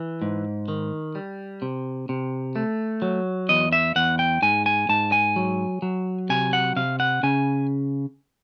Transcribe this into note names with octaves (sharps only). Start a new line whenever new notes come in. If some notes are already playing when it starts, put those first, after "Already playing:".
Already playing: E3
G#2
D#3
G3
C3
C3
A3
F#3
E2 D#5
E5
E2 F#5
G5
G#2 G#5
G#5
G#2 A5
G#5
F#3
F#3
C3 G#5
F#5
C3 F5
F#5
C#3 G#5